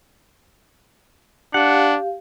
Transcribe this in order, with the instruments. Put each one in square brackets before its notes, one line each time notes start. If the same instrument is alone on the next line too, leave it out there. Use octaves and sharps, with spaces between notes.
[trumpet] D4 [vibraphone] G4 F5 [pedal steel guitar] F#5